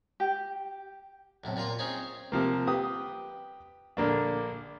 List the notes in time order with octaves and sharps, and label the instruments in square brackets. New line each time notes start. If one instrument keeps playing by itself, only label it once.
[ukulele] G4
[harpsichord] B1 A2 C3
A#2 G3 F4 A#5 C6
C4 C#4 D#4 F4 G#4
[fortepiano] C3 F3 A#3
G4 B4 D#6
A#1 D3 A#3 D4